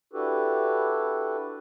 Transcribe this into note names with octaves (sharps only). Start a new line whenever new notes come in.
D4 E4 F#4 G4 A4 B4